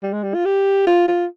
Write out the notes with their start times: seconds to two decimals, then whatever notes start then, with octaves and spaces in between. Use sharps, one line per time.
0.03 G3
0.13 G#3
0.23 G3
0.34 F4
0.45 G4
0.87 F4
1.08 F4